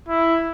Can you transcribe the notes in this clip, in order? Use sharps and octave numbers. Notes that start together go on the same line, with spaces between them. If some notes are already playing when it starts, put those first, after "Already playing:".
E4